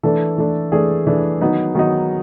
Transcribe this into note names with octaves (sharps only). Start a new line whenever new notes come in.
E3 A3 D4 A4
E3 A3 D4
E3 A3 D4 G#4
E3 A3 D4
D#3 F#3 B3 D#4
D#3 F#3 B3 D#4